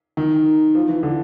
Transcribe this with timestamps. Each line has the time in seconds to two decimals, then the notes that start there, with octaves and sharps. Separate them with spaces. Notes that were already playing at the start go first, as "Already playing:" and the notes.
0.17 D#3
0.75 F3
0.89 E3
1.03 D3